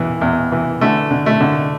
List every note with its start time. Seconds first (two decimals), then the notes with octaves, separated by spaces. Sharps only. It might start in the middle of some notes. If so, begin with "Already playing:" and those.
Already playing: E2 E3
0.21 E2
0.52 E3
0.81 D3 A3
1.11 D3
1.26 A3
1.40 D3